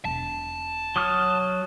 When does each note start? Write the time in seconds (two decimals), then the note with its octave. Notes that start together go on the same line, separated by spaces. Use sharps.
0.05 E1 A5
0.96 F#3 D#6 F6